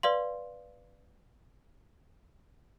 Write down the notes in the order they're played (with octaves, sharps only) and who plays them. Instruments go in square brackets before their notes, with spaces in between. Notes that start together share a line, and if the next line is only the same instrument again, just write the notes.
[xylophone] B4 D5 F5 C6